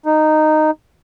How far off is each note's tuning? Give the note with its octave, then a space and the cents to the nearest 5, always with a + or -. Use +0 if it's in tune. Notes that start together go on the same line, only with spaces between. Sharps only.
D#4 -10